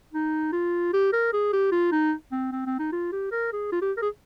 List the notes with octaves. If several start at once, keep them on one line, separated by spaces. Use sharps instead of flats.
D#4
F4
G4
A#4
G#4
G4
F4
D#4
C4
C4
C4
D#4
F4
G4
A#4
G#4
F4
G4
A#4
G#4